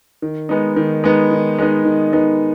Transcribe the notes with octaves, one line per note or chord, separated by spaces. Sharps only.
D#3
G#3 B3 D#4
D#3
G#3 B3 D#4
D#3
G#3 B3 D#4
D#3
G#3 B3 D#4